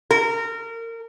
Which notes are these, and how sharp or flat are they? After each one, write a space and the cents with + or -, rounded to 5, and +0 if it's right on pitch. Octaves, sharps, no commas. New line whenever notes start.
A#4 -25